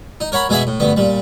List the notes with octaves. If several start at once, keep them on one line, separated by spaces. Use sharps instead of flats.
D#4
A#4 C#5 F#5 B5
B2 G#3 G#4 E5 F#5
A2
D2 G2 B3
A#2 G3